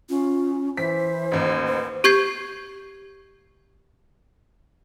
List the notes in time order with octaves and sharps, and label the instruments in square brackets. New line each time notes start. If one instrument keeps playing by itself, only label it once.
[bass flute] C#4 [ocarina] F4
[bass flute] E3 [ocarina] C5 [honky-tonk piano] B6
[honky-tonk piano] A1 D#2
[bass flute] B4 [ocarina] C5
[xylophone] G4 C#6 G6 G#6 C7